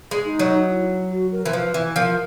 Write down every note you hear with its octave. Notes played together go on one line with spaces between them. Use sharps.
G#3
D#4
F#3
E4
F#4
A#4
E3 C5
F3 B4
E3
F3 A#4